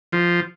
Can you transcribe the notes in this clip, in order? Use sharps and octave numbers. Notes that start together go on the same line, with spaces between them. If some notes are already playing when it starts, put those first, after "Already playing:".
F3